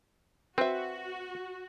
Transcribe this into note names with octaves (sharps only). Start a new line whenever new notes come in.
C4 F#4 B4 E5